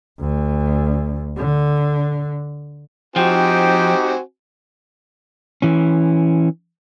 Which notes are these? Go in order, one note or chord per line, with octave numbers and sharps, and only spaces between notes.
D2
D3
F3 C4 D#4 F#4 G4 G5 G#5
E3 C#4